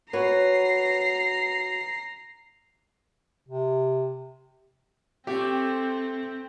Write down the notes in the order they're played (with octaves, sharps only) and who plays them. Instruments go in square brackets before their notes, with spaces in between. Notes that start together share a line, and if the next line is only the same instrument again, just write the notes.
[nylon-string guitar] F#4 B4 C#5 [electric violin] A#5 C7
[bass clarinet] C3
[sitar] A3 [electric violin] C4 [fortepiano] G4